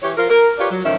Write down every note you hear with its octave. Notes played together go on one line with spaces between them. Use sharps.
E3 G4 C#5
F3 F4 A#4
A#4
F4 G4 B4 C#5 D5
F#3
A2 D#3 F3 C#4 E5